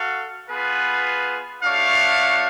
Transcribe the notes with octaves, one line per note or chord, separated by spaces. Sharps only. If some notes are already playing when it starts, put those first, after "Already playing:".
Already playing: F#4 A4 F5
B3 F4 G#4 B4
A3 D4 F#4 C#5 F5